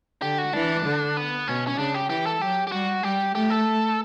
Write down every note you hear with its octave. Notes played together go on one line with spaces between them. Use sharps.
D3 G4
F#4
E3 D4
D3
B3
B2 C#4
C#4
C#3 D4
G4
E3 G4
A4
F#3 G4
G4
G3 F#4
G3 G4
A3 G4
A4